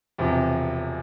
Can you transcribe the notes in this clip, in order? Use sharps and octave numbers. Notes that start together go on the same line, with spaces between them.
E1 E2 C3 F3